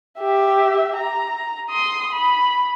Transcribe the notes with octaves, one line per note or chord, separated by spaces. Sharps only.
G4 E5
A#5
C6 D#6
B5